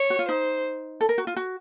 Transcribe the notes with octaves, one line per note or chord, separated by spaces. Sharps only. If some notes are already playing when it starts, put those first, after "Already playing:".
Already playing: C#5
F#4
F4
D#4 C5
A4
A#4
F#4
F4
F#4